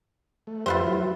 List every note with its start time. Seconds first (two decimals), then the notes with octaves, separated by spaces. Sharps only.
0.47 A3
0.66 F2 F4 G4 B4 C5 E5
0.87 F#3 E4